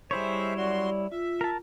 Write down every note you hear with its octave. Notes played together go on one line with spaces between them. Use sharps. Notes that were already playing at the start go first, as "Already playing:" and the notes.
G3 G#3 E4 C5 C#5 E5
F#2 F#4 D5 C6
F4 E5
A#4 A5